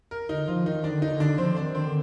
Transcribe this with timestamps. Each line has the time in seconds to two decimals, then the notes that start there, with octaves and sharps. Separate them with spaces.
0.11 A#4
0.29 D3 D#4
0.47 F3 F4
0.66 D#3 D#4
0.84 D4
0.90 D3
1.02 D#4
1.14 D3
1.20 D4
1.38 F3 C4
1.53 D3 D4
1.63 D#3
1.75 C4
1.87 D3